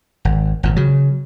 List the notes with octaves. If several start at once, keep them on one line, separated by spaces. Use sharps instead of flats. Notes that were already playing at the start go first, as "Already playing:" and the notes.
G#1
G#1 A#2
C#3 F#3